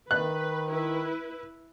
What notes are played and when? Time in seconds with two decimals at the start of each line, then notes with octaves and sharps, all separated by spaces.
0.11 D#3 B4 F#6
0.67 E4 B4